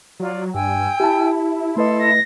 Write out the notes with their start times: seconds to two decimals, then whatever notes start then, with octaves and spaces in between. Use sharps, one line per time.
0.20 F#3 F4 D5
0.54 G2 G5 G#5 E6
1.00 E4 G4 A5
1.77 A3 A4 B4 D#5 C6
1.99 A#6